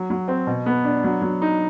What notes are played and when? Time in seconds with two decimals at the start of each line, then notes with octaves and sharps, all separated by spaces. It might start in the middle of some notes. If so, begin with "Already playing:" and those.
Already playing: F#3
0.10 F#3
0.28 C4
0.47 B2
0.66 B3
0.84 D4
1.04 F#3
1.22 F#3
1.42 D#4